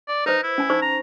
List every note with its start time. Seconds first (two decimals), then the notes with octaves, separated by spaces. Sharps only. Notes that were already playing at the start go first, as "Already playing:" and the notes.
0.08 D5
0.26 D#4 B4 C5
0.43 E4
0.58 C#4 G#5
0.70 D#4 C5 C#6
0.82 A#5